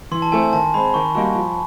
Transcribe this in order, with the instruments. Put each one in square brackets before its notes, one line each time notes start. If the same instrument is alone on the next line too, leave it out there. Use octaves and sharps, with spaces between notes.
[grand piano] E3 [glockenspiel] C6
[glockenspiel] A5
[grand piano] A3 C4 E4 A4 [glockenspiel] G#5
[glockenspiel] G#5
[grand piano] D#3 [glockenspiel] A5
[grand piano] G#3 C4 [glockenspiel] B5
[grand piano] D#3 [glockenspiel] C#6
[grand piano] G3 A#3 D#4 F#4
F3